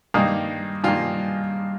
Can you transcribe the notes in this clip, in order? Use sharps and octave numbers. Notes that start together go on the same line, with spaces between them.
G2 D#3 G3 A#3 D#4
G2 D#3 G3 A#3 F4